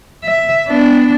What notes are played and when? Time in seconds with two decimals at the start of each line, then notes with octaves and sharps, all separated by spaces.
0.24 E5
0.67 B3 D4